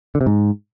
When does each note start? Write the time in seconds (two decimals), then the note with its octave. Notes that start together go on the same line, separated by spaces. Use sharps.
0.15 D3
0.21 C3
0.26 G#2